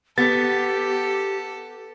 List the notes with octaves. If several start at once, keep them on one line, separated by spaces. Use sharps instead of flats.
B3 G4 A4 A6